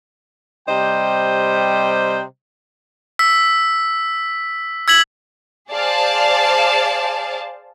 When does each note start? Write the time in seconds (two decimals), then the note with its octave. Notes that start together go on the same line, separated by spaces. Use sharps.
0.67 C3 G3 C5 D#5 G5
3.19 E6 B6
4.88 E6 G#6 B6 F#7
5.72 G#4 C5 D5 F5 A5